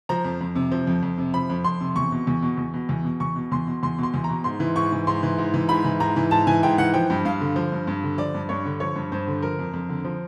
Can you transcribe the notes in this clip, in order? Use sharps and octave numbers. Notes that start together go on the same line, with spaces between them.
F3 A#5
F2
F2
C3
F3
F2
F2
C3
F3 B5
F2
F2 C6
C3
E2 C#6
B2
E2
B2
E2
B2
E2
B2
E2 C#6
B2
E2 C6
B2
E2 C6
B2 C6
E2
B2 A#5
G#2 C6
E3
G#2 C#6
E3
G#2 C6
E3
G#2
E3
G#2 B5
E3
G#2 A#5
E3
G#2 A5
E3 G#5
G#2 G5
E3 F#5
F3 G5
G2
G2 F5
D3
F3
G2
G2
D3
F3 D5
G2
G2 C#5
D3
F3 C#5
G2
G2 C5
D3
F3 A#4
F2
F2
D3
F3